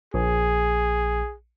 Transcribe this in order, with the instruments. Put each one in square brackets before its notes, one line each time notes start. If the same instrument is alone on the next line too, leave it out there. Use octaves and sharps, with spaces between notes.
[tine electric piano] A#1 [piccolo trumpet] G#4